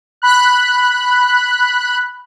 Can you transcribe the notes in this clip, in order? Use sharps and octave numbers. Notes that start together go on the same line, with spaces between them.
B5 F#6